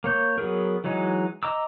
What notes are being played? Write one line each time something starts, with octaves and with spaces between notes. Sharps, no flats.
A#3 C#5 G6
F#3 B3 G#4 A#4
E3 F#3 G#3 D#4
D#5 A#5 D6 E6